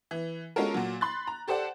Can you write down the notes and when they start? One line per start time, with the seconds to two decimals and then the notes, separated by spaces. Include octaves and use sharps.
0.11 E3
0.56 G#3 C#4 F4 F#4 A4 A#4
0.74 A#2 F#3
1.01 B5 C6 F#6 A6
1.27 A#5
1.48 G4 A4 C5 D5 F#5